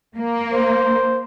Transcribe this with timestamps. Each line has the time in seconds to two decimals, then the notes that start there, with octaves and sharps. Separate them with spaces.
0.17 A#3
0.52 C5